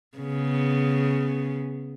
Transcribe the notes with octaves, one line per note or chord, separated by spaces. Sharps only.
C#3 B3